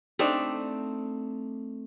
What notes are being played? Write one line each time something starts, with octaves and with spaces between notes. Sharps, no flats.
A3 C4 D4 D#4